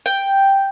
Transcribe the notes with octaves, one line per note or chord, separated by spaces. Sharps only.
G5